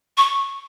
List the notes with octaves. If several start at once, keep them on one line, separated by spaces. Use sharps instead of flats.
C#6